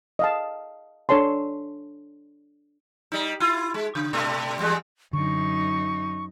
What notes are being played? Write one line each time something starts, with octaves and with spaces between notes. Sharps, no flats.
D#5 F5 A5
D4 A4 C#5 A5 C6
G3 D#4
E4 F4
G#3
C#3
G2 B2 A3
E2 G3 G#3
F#2 D3 D#4 C#6